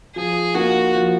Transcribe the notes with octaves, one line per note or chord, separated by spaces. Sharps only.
F3 G#4
A#3 D#4 F#4
F3